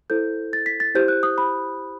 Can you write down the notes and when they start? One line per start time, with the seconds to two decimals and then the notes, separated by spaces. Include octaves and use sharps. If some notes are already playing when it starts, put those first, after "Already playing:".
0.10 E4 A4 C5 G6
0.53 A6
0.66 B6
0.80 A6
0.95 E4 G4 C5 G6
1.08 F#6
1.23 D#6
1.38 B5